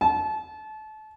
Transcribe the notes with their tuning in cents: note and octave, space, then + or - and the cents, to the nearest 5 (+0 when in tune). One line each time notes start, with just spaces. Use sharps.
A5 -30